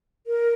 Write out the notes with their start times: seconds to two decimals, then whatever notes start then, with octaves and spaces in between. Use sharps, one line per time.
0.27 A#4